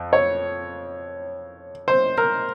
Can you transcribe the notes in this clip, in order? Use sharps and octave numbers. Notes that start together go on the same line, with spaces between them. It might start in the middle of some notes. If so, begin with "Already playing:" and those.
Already playing: F2
C#5
C5
A#4